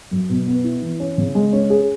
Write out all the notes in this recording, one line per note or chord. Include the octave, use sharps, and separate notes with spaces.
F#2
B2
B3
E4
E3
C#4
C#3
G#3
C#4
G#4